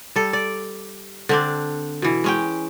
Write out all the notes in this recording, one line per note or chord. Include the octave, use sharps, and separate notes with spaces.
G3 A4
D5
D3 C4 D4
B2 E3
G#3 C#4 G5